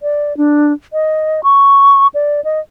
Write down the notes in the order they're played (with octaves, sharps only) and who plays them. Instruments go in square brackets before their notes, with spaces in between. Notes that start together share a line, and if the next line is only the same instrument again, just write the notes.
[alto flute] D5
D4
D#5
C#6
D5
D#5